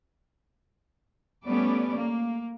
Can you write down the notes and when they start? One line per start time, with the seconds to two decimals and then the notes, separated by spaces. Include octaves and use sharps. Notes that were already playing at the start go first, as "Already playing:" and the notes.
1.47 G3 A3 B3 C#4 D5
1.97 A#3